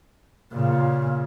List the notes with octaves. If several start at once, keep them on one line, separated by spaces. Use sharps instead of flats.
A#2 C#3